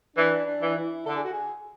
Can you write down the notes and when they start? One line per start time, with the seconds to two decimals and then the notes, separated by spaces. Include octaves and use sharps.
0.16 E3 D4
0.46 D4
0.61 E3
0.77 E4
1.06 D3 A4
1.16 G#4
1.24 F#4
1.32 G#4